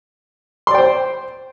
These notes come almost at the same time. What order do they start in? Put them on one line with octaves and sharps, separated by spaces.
C6 D5 G5 C5